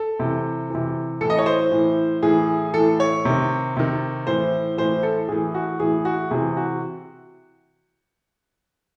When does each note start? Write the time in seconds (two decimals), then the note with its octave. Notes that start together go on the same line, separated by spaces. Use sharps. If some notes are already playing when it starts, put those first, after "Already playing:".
Already playing: A4
0.19 C3 E3
0.70 C3 E3
1.21 A2 E3 A4
1.30 D#5
1.39 C#5
1.46 C5
1.72 A2 E3
2.23 A2 E3 G#4
2.74 E3 A4
2.79 A2
3.00 C#5
3.25 C3 D#3
3.77 C3 D#3
4.27 A2 E3 C5
4.78 A2 E3 C5
5.03 A4
5.28 A2 E3 G#4
5.54 F#4
5.80 A2 E3 G#4
6.05 F#4
6.30 C3 E3 G#4
6.57 F#4